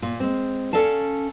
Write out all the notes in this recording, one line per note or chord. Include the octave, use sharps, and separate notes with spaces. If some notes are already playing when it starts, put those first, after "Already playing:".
A#2
G#3 C4
C#4 A4 D5 F5 A5